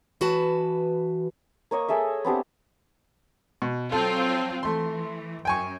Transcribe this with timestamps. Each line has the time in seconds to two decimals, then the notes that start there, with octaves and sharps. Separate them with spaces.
0.21 E3 F#4 B4 A5
1.71 A#3 C#5 D#5 C#6
1.88 G#4 A4 D#5 E5
2.25 B3 C4 D4 G4
3.62 B2
3.92 F#3 C4 F4 A4
4.63 E3 A3 C6
5.45 F#2 G5 G#5 C#6